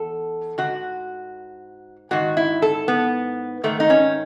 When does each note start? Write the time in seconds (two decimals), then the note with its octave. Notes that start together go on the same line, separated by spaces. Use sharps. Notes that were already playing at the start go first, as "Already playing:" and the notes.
Already playing: E2 A4
0.58 G#2 D#3 F#4
2.11 G#2 D#3 F#4
2.37 E4
2.62 A4
2.88 B3
3.63 G#2 D#3 A3
3.80 D#4
3.90 C#4